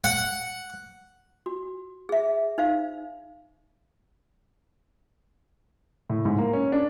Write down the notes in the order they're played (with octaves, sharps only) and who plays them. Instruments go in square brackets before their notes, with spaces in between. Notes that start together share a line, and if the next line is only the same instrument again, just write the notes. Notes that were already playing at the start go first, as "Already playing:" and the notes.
[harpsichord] F#5
[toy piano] F#4
G#4 E5
D#4 C5 F5
[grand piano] A2
G#2
A#3
C#4
D4